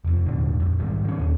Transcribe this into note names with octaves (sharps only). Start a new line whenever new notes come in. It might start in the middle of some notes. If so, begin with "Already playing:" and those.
F1 F2
D#1 G#2 D3
A#1 F2
G#2 D#3 G3
D#3 C#4
D#2 C#4